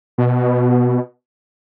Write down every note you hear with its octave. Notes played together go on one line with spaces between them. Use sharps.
B2